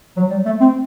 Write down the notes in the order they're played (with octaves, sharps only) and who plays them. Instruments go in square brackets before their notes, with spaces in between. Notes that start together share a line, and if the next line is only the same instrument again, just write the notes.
[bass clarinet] F#3
G3
A3
C4